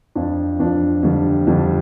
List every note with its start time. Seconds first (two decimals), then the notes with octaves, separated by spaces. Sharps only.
0.15 F2 F3 D4 F4
0.59 F2 F3 D4 F4
1.03 F2 D3 G3 D4
1.47 F2 D3 G3 D4